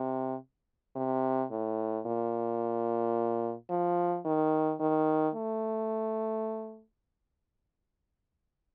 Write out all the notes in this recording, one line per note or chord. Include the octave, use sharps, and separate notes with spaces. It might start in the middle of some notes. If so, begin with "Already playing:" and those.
Already playing: C3
C3
A2
A#2
F3
D#3
D#3
A3